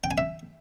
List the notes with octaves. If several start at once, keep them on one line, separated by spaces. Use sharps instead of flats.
G5
G#5
E5